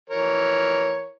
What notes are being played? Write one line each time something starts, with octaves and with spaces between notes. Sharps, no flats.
E3 A#4 C#5